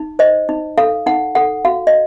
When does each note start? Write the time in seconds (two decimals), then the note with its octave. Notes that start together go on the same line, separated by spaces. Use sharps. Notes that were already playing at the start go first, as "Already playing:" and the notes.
Already playing: D#4
0.19 C5 D#5
0.49 D#4
0.78 A4 F5
1.06 D#4 F#5
1.35 A4 F#5
1.65 F#4 F5
1.87 D#5